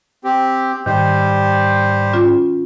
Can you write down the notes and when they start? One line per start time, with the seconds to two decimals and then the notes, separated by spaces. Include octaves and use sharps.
0.24 C4 G4
0.86 G#2 D#3 G3 G4 C5
2.13 C#4 F4